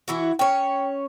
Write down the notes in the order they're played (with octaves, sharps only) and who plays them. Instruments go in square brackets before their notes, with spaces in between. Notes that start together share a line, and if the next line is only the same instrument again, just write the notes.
[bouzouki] E3 E4 F#4
[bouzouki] C#4 C#5 [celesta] G5